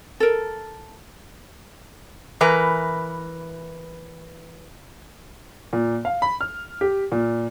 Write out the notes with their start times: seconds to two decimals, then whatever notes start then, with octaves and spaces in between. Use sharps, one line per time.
0.20 A4 A#4
2.41 E3 A#4 B4 G#5
5.73 A#2
6.05 F5
6.22 B5
6.41 F6
6.81 G4
7.12 A#2